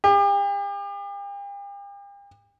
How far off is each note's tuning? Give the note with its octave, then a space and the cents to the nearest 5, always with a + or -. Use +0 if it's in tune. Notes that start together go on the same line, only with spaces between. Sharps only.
G4 +40